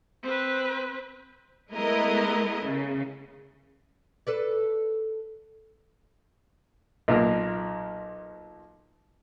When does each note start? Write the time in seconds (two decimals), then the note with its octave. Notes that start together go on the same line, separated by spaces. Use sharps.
0.23 C4 B4
1.70 G#3 A3 B3 E4 A#4 D#5
2.63 C#3
4.27 A4 B4 D5
7.08 B1 A#2 A#3 A#4